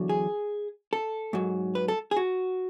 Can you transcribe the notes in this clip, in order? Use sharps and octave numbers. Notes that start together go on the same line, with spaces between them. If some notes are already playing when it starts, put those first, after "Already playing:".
Already playing: E2 D3 F#3
G#4
A4
G#2 F#3
B4
A4
G#4
F#4